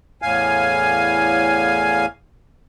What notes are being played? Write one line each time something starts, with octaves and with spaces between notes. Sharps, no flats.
E2 A2 F5 G#5